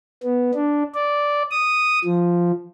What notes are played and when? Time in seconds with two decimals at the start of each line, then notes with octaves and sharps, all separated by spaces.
0.23 B3
0.54 D4
0.94 D5
1.51 D#6
2.05 F3